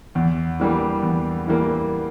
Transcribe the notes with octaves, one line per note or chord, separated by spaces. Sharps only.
E2
E3 G3 A#3
E2
E3 G3 A#3